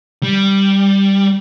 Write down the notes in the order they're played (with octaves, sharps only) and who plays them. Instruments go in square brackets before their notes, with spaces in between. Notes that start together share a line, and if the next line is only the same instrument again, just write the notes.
[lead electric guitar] G3